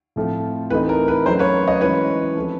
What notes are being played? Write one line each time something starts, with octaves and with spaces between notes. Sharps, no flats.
A2 F3 A3 C4 F4
E3 A3 C4 D#4 B4
A#4
B4
F#3 A3 C#4 A#4 C5
B4 C#5
C#5 D#5
E3 G#3 C#4 B4 C#5
F3 A3 C4